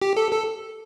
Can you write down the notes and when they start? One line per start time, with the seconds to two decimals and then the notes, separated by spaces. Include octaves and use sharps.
0.02 G4
0.17 A4
0.32 A4